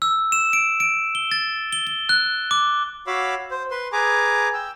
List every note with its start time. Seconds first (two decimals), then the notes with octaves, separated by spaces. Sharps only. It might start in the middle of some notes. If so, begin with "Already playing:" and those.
0.02 E6
0.32 E7
0.53 D7
0.80 D7
1.15 G7
1.32 A6
1.73 G7
1.87 G7
2.09 F#6
2.51 D6
3.07 F#4 C#5 F5 B5 D6 E6
3.51 C5
3.71 B4 C6
3.92 G#4 B4 G#5 A#5 D6
4.54 G5 E6